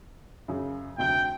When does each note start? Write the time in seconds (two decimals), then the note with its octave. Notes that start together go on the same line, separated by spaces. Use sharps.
0.48 F#2 C#3
0.98 F1 D2 G5 G7